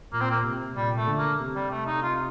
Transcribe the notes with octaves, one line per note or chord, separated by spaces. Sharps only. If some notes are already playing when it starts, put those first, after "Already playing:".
A#2 A#3
C4
A#3
C3
A#2 G3
A3
D3
A#3
C3
G3
A3
D#4
F4